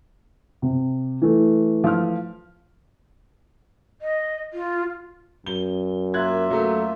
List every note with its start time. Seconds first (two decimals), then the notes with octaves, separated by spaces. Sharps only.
0.62 C3
1.22 E3 A3
1.84 F3 F6
4.02 D#5
4.53 F4
5.46 F#2 G7
6.14 A#3 F4 E5 F#6 G#6
6.50 F#3 A3